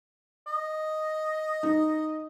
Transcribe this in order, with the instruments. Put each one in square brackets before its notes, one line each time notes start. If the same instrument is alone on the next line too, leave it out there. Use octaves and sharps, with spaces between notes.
[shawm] D#5
[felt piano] D#4